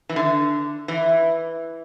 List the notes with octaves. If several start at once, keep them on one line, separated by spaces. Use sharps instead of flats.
E3
D3
E3